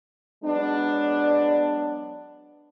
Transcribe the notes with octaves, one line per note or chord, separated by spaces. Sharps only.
F#3 G#3 B3 D4